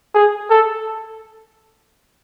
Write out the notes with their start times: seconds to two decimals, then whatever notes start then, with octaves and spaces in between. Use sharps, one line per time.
0.15 G#4
0.50 A4